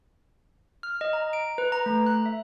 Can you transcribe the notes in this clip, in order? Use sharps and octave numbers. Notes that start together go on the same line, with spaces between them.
F6
D#5
A#5
D7
B4
A#5
A3
F#6
E5